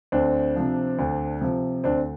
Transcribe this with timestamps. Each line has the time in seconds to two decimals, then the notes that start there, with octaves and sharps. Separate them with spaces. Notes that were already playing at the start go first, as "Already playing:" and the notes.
0.12 D2 C4 D4
0.56 C3 F3
0.99 D2
1.41 C3 F3
1.84 D2 C4 D4